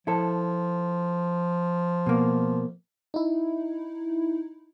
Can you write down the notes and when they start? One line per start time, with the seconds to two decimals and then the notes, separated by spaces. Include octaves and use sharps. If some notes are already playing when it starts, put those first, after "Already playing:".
0.07 F3 E4 A4
2.06 B2 A#3
3.14 D#4 E4